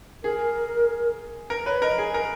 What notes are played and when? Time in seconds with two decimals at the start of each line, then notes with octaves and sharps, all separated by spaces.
0.24 G#4 A#4
1.50 A#4
1.66 B4 C#5
1.82 A#4 D#5
1.98 G#4
2.14 A#4